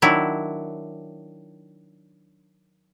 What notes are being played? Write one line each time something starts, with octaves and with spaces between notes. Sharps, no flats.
D#3 F#3 D4 E4